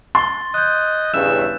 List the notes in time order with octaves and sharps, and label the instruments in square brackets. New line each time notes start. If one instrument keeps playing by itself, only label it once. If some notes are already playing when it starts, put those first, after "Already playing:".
[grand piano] C6 [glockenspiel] A6 G7
[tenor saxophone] D#5 [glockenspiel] F#6 G6
[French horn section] E2 G2 C#3 [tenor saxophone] E5 [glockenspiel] E7